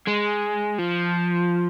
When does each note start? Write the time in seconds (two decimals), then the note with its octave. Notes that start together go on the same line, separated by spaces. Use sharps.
0.07 G#3
0.79 F3